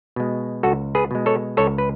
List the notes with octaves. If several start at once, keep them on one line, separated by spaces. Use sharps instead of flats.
B2 G#3
C#2 F#4 A4
G#4 B4
B2 G#3
A4 C#5
C#2 A4 C#5
B4